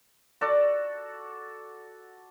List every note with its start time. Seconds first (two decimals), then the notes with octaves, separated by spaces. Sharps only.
0.41 F#4 A4 D5